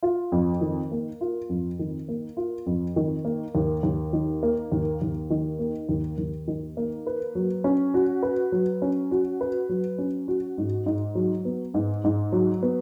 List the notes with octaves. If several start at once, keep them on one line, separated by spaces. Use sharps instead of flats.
F4
F2
D#3
A#3
F4
F2
D#3
A#3
F4
F2
D#3
A#3
D#2
D#2
D#3
A#3
D#2
D#2
D#3
A#3
D#2
D#2
D#3
A#3
B4
F#3
C#4
F#4
B4
F#3
C#4
F#4
B4
F#3
C#4
F#4
G#2
G#2
F#3
B3
G#2
G#2
F#3
B3